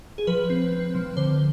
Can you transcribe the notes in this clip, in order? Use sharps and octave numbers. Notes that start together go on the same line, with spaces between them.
G#4
F3 B4
C4
C4
F3
D3 C5